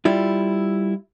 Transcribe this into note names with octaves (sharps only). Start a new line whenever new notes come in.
G3 E4 F4